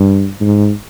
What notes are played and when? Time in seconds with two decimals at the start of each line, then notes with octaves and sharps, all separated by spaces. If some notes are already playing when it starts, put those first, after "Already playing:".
Already playing: G2
0.40 G#2